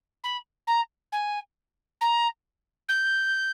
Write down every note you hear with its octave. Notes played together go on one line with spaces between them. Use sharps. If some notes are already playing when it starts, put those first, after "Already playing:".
B5
A#5
G#5
A#5
G6